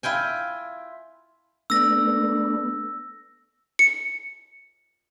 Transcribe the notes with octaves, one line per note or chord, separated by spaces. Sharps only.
E4 F4 G5 G#5
A3 B3 D4 E6 A#6
C#7